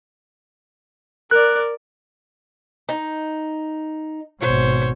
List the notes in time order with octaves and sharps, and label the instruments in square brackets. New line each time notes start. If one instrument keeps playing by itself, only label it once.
[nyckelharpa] A#4 D5 [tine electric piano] F#6
[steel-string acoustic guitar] D#4
[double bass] G#1 B2 [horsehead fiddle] C5 C#5